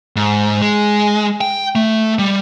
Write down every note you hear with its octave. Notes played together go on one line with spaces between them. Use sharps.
G#2
G#3
G5
A3
G3